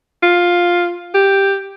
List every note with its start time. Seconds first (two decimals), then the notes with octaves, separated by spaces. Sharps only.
0.23 F4
1.14 G4